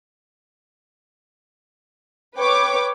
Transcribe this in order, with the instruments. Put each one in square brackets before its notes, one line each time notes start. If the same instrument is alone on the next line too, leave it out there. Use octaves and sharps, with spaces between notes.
[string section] B4 C#5 G5 C#6 D6